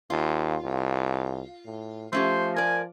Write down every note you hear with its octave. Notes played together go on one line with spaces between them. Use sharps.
D#2 F4
C2
A2
F3 A3 C#4 G4 C5
A#4 D5 G#5